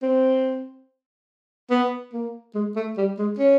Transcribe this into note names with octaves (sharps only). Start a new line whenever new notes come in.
C4
B3
A#3
G#3
A3
G3
G#3
C#4